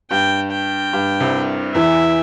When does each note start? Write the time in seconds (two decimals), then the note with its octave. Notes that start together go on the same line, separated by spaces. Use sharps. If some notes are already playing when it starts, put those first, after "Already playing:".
0.11 G2 G5
0.51 G5
0.93 G2
1.20 C2 C3
1.75 E2 E3 E5